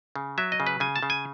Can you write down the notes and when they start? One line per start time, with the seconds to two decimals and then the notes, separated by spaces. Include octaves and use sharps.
0.16 C#3
0.38 F#3 E5
0.52 D#5
0.60 C#3
0.67 B4
0.80 C#3 G#5
0.96 A5
1.03 C#3
1.10 G#5